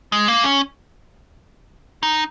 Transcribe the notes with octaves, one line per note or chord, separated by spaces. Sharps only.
G#3
A#3
C#4
D#4